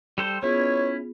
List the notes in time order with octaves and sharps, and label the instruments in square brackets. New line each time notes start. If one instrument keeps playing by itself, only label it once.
[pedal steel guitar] G3 A4 C5
[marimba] B3 F4 G#4 [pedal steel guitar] C#4 E4 [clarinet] C#5